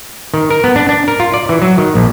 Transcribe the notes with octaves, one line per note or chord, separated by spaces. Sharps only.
D#3
A#4
B3
D4
D4
A#4
F4
D5
E3
F#3
D#3
A#1